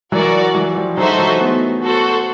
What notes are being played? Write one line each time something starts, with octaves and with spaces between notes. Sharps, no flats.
E3 F#3 F#4 A#4 D5
E3 F#3
F3 G3
F#3 G#3 D#4 F#4 A4 C5 E5
E3 F#3
A3 B3
F#4 A4 C5